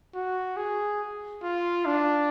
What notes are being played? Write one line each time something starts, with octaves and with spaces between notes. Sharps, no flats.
F#4
G#4
F4
D4